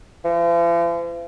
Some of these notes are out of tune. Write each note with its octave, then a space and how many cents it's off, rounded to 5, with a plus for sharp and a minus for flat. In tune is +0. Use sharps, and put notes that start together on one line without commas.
F3 -45